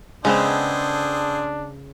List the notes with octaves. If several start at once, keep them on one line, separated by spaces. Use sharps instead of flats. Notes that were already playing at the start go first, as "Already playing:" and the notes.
C#3 G#3 B3 C4 D4 G#4 A4 C5